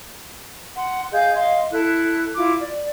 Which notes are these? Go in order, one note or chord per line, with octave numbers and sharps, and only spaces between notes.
F#5 C6
G#4 D#5 F5 G6
D#5 F5 C6
E4 A4 F#6
E4 F4 D6
D5